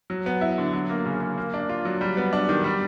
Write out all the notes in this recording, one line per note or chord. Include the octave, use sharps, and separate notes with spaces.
F#3
B3
E4
D3
F#3
A#3
C#3
C#3
A#3
D4
F4
F#3
G3
B3
D4
D#3
G3